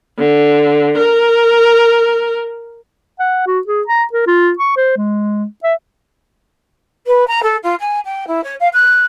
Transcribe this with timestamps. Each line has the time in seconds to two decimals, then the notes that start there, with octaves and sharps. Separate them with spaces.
0.18 D3
0.97 A#4
3.20 F#5
3.47 F#4
3.67 G#4
3.87 A#5
4.13 A#4
4.27 F4
4.58 C#6
4.77 C5
4.97 G#3
5.64 E5
7.07 B4
7.27 A#5
7.42 A4
7.63 F4
7.79 G#5
8.04 G5
8.27 E4
8.43 C#5
8.60 F5
8.73 F#6